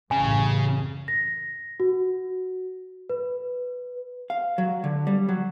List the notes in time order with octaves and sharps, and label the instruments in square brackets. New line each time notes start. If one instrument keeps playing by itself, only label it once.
[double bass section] A1 F#2 [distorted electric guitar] C#3 [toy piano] G#5
[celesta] A#6
F#4
B4
[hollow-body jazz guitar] F5
F#3
D3
G3
F#3